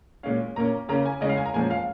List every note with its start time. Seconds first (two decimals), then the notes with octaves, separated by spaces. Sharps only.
0.23 A#2 G#3 C#4 F5
0.56 A#2 A#3 C#4 A#5
0.89 C#3 A#3 C#4 A#5
1.06 G#5
1.21 C#3 G#3 C#4 D#5
1.29 F5
1.37 G#5
1.46 A#5
1.54 A#2 F3 G#3 C#4 G#5
1.70 F5